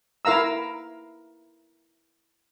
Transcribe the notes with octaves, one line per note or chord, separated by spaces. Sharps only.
E4 A#4 F5 A#5 E6